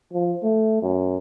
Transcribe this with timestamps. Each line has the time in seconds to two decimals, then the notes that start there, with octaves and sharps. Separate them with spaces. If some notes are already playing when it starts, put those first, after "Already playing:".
0.13 F3
0.43 A3
0.82 F#2